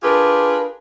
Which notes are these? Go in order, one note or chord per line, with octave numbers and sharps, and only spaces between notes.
D4 F4 G4 G#4 A#4 B4